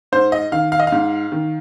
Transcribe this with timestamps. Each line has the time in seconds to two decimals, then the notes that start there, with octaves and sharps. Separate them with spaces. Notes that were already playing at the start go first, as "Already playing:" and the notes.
0.12 G#2 C5
0.32 D#5
0.52 D#3 F5
0.72 F5
0.80 D#5
0.87 G#2 F5
1.32 D#3